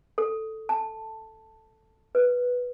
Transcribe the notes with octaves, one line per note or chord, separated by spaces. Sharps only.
A4
A5
B4